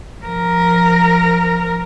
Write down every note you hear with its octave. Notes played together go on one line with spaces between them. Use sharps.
F3 A#4